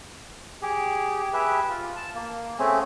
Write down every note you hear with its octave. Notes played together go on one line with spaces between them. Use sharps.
G4 G#4
G4 G#4 B4 E5
F4
A5
A#3
A3 C4 C#4 G#4